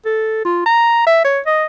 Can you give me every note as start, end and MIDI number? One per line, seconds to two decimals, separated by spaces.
0.05 0.42 69
0.45 0.62 65
0.66 1.05 82
1.06 1.23 76
1.24 1.40 73
1.46 1.65 75